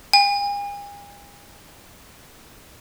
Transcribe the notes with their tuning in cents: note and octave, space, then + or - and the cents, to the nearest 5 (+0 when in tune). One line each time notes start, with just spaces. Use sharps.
G#5 -45